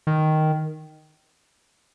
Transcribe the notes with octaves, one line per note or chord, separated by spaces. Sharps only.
D#3